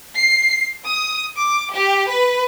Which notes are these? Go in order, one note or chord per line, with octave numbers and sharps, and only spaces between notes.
C7
D#6
D6
G4
B4